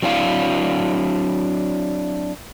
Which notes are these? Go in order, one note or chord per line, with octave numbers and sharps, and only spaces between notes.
F#3 C4 D4 E4 F5